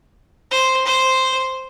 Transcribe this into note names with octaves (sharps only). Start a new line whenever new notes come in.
C5
C5